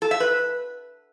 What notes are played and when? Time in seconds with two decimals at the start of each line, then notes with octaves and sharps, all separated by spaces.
0.02 A4
0.11 E5
0.20 B4